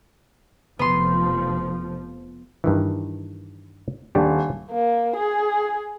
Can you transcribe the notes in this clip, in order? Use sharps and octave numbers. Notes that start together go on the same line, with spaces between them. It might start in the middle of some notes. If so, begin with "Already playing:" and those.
F1 F3 B3 C6
G2 D#3 E3
D#1 D4 G4
A#3
G#4